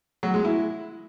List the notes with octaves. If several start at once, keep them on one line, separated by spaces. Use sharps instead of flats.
F#3
G#3
E4